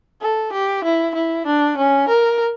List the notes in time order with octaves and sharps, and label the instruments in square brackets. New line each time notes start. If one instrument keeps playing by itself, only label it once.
[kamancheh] A4
G4
E4
E4
D4
C#4
A#4